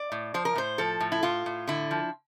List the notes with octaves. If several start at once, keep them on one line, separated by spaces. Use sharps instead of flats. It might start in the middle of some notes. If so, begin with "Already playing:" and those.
Already playing: D5
A2
F3 C5
A#4
A2 C5
F3 A4
A2
E4
A2 F4
A2
D3 E4
F3